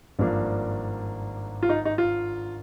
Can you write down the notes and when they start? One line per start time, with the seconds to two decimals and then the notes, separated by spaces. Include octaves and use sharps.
0.19 G#1 G2 F3 A#3 D4
1.63 F4
1.69 D#4
1.85 D#4
1.98 F4